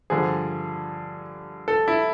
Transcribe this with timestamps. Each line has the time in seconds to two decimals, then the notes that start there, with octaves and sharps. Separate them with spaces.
0.10 G2 D3 F3 G#4
1.68 A4
1.88 E4